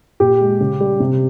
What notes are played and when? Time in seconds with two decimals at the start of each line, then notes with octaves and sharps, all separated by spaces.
0.20 A#2 G4
0.40 G#3
0.60 C#3
0.80 G3
1.00 C3